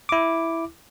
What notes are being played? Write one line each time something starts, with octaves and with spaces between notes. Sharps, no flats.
E4 D6